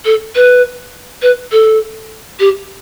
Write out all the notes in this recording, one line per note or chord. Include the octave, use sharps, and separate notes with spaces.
A4
B4
B4
A4
G4